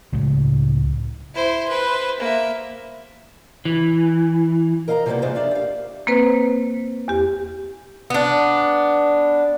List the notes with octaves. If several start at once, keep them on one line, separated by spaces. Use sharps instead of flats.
C#2 A2 C#3 G#3
E4 C5
B4 C5
A#3 E5
E3
A#4 D#5 F5 G5 A#5
C3 F3 G3 G#3 A#3 B3
D#2 G#2 D#3 G#4 C5 D5
D4 F4 D5 E5
G4 F5
A#3 C4 B4 C5
E2 G4
B3 D4